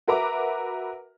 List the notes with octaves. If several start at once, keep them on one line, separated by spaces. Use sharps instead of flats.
F#4 A#4 B4 E5 A#5 D6